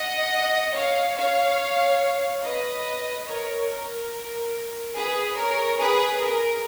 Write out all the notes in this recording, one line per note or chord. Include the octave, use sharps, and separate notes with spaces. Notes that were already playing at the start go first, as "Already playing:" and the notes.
Already playing: D#5 F#5
C#5 F5
C#5 F5
B4 D#5
A#4 C#5
A#4
G#4 B4
A#4 C#5
G#4 B4
A#4